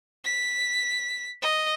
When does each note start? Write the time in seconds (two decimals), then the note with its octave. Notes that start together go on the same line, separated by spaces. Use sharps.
0.25 B6
1.42 D#5